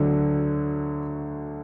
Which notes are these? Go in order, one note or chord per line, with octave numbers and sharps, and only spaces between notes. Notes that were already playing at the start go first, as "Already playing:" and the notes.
Already playing: D2 D3 F#3